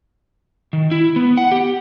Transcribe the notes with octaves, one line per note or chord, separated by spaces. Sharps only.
D#3
E4
B3
F#5
G4